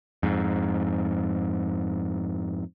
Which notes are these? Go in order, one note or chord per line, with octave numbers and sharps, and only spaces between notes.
F2 G#2